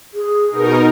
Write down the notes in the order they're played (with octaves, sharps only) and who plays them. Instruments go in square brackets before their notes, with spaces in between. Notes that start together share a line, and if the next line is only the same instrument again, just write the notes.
[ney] G#4
[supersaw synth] B2 D#4 A#4